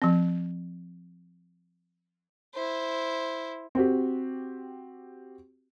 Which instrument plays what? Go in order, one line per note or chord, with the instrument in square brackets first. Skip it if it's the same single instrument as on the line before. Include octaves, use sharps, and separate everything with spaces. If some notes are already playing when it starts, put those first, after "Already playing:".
[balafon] F3 C4
[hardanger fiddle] E4 C5
[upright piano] C4 F#4 G4